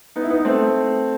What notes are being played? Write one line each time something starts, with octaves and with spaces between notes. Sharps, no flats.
B3 D#4
E4
B3 D#4
A3 C4